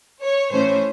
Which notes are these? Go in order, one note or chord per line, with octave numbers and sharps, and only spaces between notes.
C#5
A2 E3 A3 C#4 C5